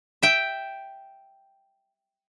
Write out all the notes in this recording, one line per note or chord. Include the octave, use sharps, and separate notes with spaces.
E5 G5